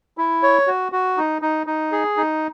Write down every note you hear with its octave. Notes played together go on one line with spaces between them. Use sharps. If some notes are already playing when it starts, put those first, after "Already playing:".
E4
C#5
F#4
F#4
D#4
D#4
D#4
G#4
D#4